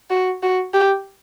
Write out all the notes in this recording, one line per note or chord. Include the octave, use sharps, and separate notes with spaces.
F#4
F#4
G4